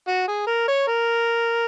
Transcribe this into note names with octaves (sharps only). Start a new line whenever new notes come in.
F#4
G#4
A#4
C#5
A#4